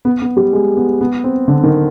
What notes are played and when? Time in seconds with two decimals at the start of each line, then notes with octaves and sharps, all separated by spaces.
0.05 B3
0.22 B3
0.37 G3
0.53 G#3
0.77 B3
1.01 B3
1.24 C4
1.48 D3
1.63 D#3